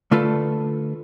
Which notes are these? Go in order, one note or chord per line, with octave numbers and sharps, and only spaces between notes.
D3 A3 F4 A4 B4